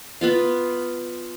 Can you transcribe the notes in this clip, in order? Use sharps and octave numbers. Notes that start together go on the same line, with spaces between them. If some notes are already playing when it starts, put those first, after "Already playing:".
B3 F4 F5